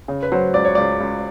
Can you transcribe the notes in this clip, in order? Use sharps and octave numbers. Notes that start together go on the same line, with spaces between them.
C#3
B4
F#3 C5
C#2 D5
C#5
C#2 D5
C#2